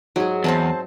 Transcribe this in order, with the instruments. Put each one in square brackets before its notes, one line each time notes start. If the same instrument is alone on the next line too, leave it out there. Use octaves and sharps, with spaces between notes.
[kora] G#2 G#4 [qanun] F#3
[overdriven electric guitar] E2 [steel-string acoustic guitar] C4 C5 A5